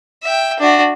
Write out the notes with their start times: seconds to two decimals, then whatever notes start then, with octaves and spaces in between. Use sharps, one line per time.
0.23 E5 G5
0.59 D4 F#4